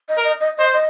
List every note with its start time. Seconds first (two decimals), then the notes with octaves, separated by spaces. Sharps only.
0.09 D#5
0.17 A#4
0.24 D#5
0.40 D#5
0.57 C5 D#5
0.73 D#5